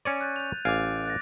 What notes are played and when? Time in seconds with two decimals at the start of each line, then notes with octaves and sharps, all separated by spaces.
0.05 C#4 C#5 D5 D#7
0.21 F#6 G6 A6
0.36 G6 F7
0.65 A1 F5 G#5 D6 A6 D7
1.06 F#6 A6 A#6